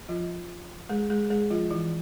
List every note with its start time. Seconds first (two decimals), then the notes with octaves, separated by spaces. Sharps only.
0.09 F3 F4
0.90 G#3 G#4
1.10 G#3 G#4
1.30 G#3 G#4
1.50 F3 F4
1.70 E3 E4